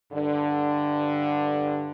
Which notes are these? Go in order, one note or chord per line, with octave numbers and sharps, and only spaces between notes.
G2 D3